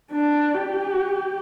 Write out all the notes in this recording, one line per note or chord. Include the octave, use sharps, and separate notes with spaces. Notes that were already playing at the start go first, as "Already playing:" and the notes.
D4
G4